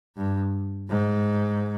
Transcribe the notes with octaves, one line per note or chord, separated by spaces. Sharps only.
G2
G#2